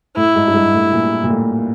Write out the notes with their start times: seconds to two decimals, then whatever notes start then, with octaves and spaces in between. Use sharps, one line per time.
0.17 A2 E4
0.36 G#2
0.47 G2
0.54 G#2
0.74 A2
0.92 A#2
1.24 A#2
1.30 A2